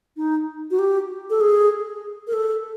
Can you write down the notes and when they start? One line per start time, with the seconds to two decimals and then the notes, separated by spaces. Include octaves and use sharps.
0.17 D#4
0.71 F#4
0.79 G4
1.30 A4
1.41 G#4
2.27 A#4
2.33 A4